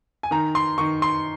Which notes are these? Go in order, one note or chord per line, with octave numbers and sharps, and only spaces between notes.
G#5
D#3 A#5
C6
D#3 C#6
C6